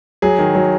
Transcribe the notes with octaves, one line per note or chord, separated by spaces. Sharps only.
F#3 G#4
D#3
F#3